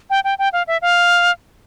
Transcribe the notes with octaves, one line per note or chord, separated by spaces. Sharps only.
G5
G5
G5
F5
E5
F5